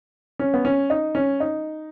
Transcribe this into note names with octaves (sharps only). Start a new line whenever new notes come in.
C#4
B3
C#4
D#4
C#4
D#4